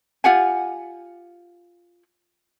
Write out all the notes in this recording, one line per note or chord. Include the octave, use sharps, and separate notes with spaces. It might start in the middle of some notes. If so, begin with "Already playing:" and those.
F4 G4 F#5 G#5